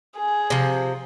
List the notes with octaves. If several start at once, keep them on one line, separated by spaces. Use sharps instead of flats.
G#4
C3 F3